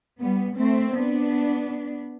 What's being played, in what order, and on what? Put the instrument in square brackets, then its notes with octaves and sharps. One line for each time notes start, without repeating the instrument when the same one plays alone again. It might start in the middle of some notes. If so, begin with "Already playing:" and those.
[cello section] G3 B3
A3 C4
B3 D4